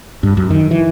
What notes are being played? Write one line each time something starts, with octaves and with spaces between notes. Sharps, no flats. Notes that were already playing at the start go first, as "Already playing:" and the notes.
G2
F#2
D#3
E3